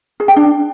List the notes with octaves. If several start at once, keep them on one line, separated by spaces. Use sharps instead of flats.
G#4
G5
D4